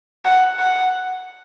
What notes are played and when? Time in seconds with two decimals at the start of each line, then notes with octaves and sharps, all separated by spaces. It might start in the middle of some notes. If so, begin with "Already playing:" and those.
0.25 F#5
0.59 F#5